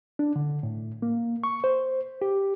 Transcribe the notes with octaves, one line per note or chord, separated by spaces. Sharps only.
D4
D3
A2
A#3
C#6
C5
G4